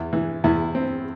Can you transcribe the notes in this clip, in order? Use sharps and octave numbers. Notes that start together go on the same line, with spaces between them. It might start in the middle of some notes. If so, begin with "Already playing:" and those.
Already playing: E2
E3
E2 E4
C4